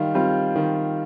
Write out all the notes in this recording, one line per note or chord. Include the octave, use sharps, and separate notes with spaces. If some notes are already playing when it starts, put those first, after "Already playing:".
Already playing: D#3 G3 F4
G3 C4 F4
D#3